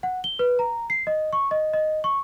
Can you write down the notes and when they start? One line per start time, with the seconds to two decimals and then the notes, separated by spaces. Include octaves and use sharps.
0.03 F#5
0.24 G7
0.39 B4
0.59 A#5
0.90 C7
1.07 D#5
1.33 C#6
1.51 D#5
1.73 D#5
2.04 C#6